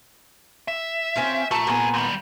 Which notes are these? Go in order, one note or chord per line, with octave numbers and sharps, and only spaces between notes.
E5
C4 C#4 F4
A#2 A3 A5
C2 A#2 B3 G#4
D#2 G3